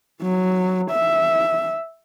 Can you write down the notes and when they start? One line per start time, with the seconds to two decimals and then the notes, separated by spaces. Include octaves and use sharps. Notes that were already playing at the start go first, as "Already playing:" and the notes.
0.22 F#3
0.91 E5